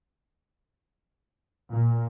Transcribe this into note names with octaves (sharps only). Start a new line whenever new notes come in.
A#2